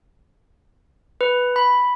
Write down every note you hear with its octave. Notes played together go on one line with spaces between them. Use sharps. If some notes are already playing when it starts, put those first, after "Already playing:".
B4
B5